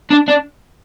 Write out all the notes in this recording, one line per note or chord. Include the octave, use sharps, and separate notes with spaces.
D4
D4